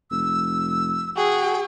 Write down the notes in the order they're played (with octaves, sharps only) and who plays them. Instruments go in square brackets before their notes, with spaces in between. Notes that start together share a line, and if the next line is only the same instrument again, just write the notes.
[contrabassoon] F1 [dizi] E6
[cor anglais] F#4 [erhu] G#4 [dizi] G5